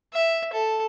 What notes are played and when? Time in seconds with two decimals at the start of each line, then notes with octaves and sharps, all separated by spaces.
0.14 E5
0.53 A4